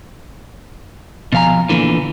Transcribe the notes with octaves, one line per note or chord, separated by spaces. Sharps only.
B2 F3 F5 G#5 A#5
E2 G2 A#2 D3 E3